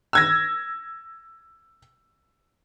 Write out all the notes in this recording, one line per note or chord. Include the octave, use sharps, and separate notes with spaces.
E6 G#6 A#6